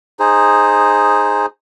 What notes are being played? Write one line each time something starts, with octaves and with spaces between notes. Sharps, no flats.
D#4 G#4 C5